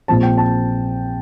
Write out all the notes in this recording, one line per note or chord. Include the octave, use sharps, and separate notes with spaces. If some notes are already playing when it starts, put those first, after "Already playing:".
A#1 A#2 F3 C4 A5
G5
A5